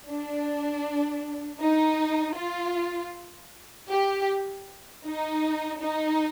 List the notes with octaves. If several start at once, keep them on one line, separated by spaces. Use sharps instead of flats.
D4
D#4
F4
G4
D#4
D#4